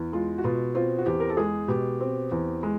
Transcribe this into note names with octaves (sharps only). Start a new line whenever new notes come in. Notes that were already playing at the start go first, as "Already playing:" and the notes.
Already playing: E2
G#3 F4
F#4
B2 F4
C4 F4
F#4
E2 G4
A#4
A4
G#3 G#4
B2 G4
C4
E2
G#3